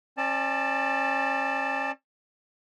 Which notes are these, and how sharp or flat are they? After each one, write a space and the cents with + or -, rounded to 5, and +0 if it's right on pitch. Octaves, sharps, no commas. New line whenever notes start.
C#4 -35 D5 +25 A5 +0